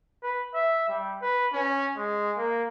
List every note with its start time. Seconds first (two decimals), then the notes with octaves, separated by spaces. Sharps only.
0.23 B4
0.54 E5
0.89 G3
1.22 B4
1.53 C#4
1.97 G#3
2.37 A#3